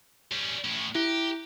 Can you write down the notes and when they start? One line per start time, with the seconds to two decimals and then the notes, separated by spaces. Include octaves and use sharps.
0.32 G3 C#4
0.64 A2 C#4
0.95 E4 G4